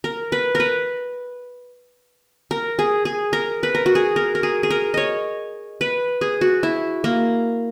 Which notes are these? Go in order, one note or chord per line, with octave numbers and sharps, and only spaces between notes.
A#4
B4
A#4 B4
A#4
G#4
G#4
A#4
B4
A#4
F#4
G#4
A#4
A#4
G#4
G#4
A#4
C#5 D#5
B4
G#4
F#4
E4
A#3